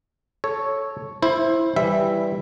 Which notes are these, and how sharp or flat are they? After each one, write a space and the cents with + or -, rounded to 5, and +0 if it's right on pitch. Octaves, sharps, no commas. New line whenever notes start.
A4 -5 C#5 +0
E4 +0 C5 +15
E3 +0 G3 +0 E5 +0